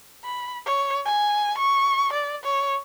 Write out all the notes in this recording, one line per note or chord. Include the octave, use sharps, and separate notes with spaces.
B5
C#5
G#5
C#6
D5
C#5